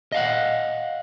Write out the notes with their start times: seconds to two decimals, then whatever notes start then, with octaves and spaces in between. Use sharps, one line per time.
0.12 D#5 F5 F#5